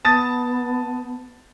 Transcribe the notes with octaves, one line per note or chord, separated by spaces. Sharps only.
B3 A5 D#6 A6